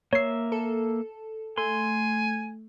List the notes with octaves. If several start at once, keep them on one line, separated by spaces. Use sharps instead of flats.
A#3 C#5 E5 C7
A4
A3 G#5 C6